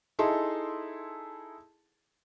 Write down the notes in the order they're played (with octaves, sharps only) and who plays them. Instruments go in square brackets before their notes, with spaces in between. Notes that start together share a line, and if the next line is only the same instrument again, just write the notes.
[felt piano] D#4 E4 G#4 A4 A5 C6